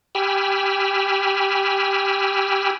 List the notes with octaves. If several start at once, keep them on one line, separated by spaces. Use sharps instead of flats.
G4 G5 G#5 B5 E6 F6